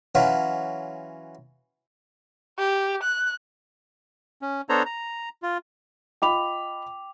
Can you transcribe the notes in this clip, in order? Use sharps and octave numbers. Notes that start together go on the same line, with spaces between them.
E3 F#3 C#4 F4 F#4
G4
F#6
C#4
B3 D4 A4 C5 C#5 A#5
A#5
F4
F4 D#5 G5 B5 D6 F7